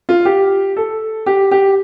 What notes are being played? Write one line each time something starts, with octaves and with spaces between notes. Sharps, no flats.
F4
G4
A4
G4
G4